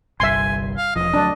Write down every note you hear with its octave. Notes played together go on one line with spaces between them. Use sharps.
G1 C2 G2 E5 G#5 C6
F5
E1 E2 F3 D#5
D2 F#3 D4